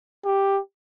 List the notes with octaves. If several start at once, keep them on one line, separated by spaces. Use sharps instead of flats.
G4